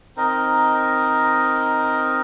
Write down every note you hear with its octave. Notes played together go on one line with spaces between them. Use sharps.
C4 D#4 A#4 D#5